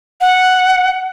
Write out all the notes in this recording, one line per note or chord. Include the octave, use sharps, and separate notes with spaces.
F#5